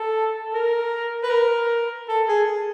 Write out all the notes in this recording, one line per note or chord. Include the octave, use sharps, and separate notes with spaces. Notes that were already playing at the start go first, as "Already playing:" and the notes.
Already playing: A4
A#4
B4
A#4
A4
G#4